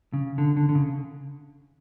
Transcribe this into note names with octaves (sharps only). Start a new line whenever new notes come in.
C#3
D3
D3
D3
C#3